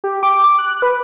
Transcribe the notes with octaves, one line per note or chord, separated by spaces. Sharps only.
G4
D6
D6
F#6
B4